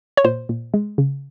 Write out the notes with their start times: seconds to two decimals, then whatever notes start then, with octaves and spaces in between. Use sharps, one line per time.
0.17 C#5
0.24 A#2 C5
0.49 A#2
0.74 G#3
0.98 C#3